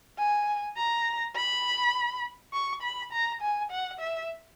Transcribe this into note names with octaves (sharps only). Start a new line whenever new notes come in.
G#5
A#5
B5
C#6
B5
A#5
G#5
F#5
E5